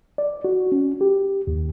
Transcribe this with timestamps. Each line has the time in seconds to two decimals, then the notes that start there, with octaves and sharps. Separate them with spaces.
0.18 D5
0.44 F#4
0.72 C#4
1.01 G4
1.47 D#2